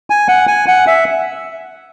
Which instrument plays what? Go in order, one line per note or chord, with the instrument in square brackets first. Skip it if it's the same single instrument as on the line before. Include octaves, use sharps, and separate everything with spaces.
[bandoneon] G#5
F#5
G#5
F#5
E5